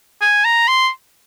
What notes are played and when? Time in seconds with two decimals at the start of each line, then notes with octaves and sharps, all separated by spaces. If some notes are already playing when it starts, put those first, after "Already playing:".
0.21 G#5
0.45 A#5
0.68 C6